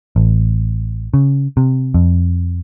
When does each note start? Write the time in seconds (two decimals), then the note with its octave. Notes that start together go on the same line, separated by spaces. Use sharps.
0.16 A1
1.14 C#3
1.57 C3
1.94 F2